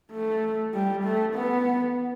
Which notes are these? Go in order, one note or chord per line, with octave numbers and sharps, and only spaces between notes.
A3
G3
A3
B3